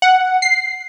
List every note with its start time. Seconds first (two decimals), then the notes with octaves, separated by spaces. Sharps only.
0.02 F#5
0.42 C7